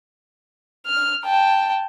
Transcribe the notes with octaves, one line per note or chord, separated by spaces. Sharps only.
F6
G5 A5